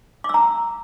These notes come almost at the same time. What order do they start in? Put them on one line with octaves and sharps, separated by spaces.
D6 E6 A#5